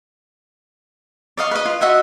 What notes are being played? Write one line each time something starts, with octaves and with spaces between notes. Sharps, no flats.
D5 D#5 F5 C#6
B4 D#5
F4
F#4 D#5 E5 F#5